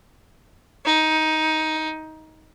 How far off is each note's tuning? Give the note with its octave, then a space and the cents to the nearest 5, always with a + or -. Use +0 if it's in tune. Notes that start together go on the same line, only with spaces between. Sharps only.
D#4 +15